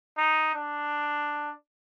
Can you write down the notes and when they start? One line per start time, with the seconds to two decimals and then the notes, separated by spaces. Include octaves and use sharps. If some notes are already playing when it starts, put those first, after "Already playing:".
0.18 D#4
0.54 D4